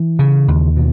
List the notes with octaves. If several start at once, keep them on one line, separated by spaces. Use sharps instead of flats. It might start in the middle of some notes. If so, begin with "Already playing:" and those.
Already playing: E3
C#3
D#2
B2